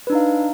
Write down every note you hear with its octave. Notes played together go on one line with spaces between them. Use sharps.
D4 D#4 B4 F5